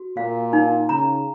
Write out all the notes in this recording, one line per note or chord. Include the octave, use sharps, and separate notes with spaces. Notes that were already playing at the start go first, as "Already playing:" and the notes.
Already playing: F#4
A#2 F5
D#4
C#3 A#5